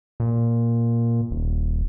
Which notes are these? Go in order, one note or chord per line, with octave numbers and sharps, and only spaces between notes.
A#2
D#1